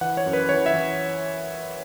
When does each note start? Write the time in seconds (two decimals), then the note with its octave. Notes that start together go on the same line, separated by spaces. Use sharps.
0.01 E3 F#5
0.17 C#5
0.26 F#2
0.33 B4
0.49 E3 C#5
0.66 E5
0.73 E3